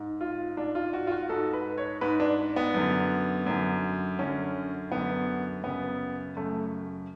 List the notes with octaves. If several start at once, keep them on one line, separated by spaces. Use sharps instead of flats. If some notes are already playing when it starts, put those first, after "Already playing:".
Already playing: G#2
F4
G#2 D4
F4
F#4
F4
F#4
G#2 A4
B4
C#5
G#2 B4
D4
B3
F#2 D3
F#2 D3
F#2 D3 C#4
F#2 D3 B3
F#2 C#3 B3
F#2 C#3 A3